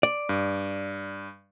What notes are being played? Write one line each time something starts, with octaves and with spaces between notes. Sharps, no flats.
D5
G2